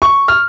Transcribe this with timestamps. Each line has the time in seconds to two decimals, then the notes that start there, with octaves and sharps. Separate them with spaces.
0.02 C#6
0.28 F6